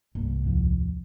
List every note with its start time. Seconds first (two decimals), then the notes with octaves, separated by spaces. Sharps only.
0.15 C2 G2 A#3
0.44 D#2 G#2 F3